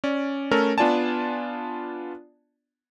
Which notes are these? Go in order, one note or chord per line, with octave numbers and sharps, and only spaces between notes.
C#4 D5
A3 C#4 A4 A#4
B3 D4 F4 D5 G#5 A5